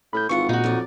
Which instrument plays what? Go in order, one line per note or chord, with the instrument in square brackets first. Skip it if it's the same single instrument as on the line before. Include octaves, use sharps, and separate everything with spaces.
[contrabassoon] A2 [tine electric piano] B5 G6
[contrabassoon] G#1 [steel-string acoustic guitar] E3 F4 F#5 [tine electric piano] C#6 C#7
[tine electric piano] A#2 [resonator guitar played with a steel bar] D#4 F#4
[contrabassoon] F2 [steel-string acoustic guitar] F#3 D5